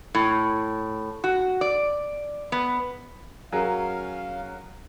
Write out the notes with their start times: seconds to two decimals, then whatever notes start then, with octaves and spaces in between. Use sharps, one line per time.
0.15 A2
1.24 F#4
1.61 D5
2.52 B3
3.52 F#3 C#4 G#4 A#4 F5